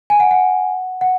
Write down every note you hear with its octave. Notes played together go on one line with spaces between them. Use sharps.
G#5
F#5
F#5
F#5